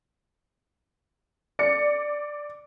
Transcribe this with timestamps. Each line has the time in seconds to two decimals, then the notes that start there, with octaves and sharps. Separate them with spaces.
1.59 D5 C#7